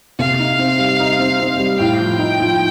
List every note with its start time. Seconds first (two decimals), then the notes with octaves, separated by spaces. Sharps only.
0.19 C3 F5
0.40 D#4
0.59 C4
0.79 G3
1.00 D#4
1.19 C4
1.40 C4
1.59 G3
1.79 A2 G5
2.00 F3
2.19 D#4
2.39 F3